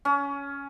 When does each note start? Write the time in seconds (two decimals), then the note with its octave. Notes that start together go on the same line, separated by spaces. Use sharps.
0.05 C#4